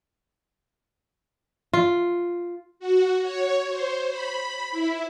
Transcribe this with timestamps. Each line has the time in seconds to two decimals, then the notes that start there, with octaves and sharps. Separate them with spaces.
1.74 F4
2.79 F#4
3.22 C#5
3.69 C5
4.10 B5
4.71 E4